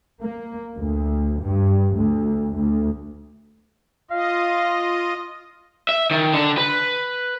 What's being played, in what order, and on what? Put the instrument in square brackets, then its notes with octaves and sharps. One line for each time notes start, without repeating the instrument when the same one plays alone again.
[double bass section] A#3
D2
G2
D2
D2
[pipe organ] F4 D#5 [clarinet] F5
[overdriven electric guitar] E5
D#3
D3
B4